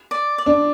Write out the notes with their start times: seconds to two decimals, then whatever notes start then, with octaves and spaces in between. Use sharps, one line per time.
0.11 D5
0.38 D5
0.46 D4